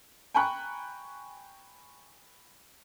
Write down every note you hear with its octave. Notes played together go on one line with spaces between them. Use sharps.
G5 G#5 A#5 B5 C#6 F#6